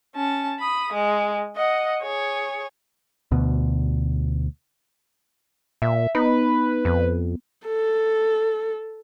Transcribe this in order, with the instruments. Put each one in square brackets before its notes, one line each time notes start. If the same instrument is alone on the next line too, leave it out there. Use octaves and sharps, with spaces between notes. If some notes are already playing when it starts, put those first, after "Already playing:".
[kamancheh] C#4 A5
B5 D#6
G#3
D#5 F#5
G#4 C#5
[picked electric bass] D2 B2
[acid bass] A#2 [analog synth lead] E5
[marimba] B3 [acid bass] D#4 [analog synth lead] B4
[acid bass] F2
[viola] A4